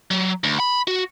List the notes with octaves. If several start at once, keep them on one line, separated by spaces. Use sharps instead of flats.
F#3
D2
B5
F#4